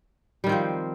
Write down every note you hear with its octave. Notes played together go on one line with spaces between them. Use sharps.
D#3 F3 G3 C4